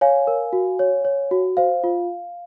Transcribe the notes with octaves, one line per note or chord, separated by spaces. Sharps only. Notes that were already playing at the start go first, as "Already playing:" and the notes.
C#5 F5 G#5
A#4
F#4
C#5
C#5
F#4
C5 F5
F4